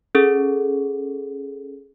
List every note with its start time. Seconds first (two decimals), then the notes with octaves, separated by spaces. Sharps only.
0.15 C#4 G#4 A4